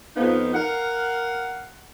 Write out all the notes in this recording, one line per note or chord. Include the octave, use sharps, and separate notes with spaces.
F2 F3 B3 D#4
A#4 F5 F#5